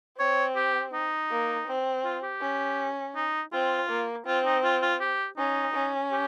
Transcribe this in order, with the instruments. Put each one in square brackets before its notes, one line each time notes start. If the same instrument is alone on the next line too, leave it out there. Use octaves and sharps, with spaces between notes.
[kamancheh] C4 [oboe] C#5
[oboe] G4
D#4
[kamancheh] A#3
C4
[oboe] F4
G4
[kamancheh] C#4
[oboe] D#4
[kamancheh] C4 [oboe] F4
[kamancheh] A#3
[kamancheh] C4 [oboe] F4
[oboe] D#4
F4
F4
G4
[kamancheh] C#4 [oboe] D#4
[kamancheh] C#4
[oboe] G4